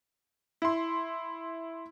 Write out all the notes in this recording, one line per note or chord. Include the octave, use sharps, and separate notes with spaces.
E4 C6